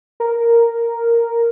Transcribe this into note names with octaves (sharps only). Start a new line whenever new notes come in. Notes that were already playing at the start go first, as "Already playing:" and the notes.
A#4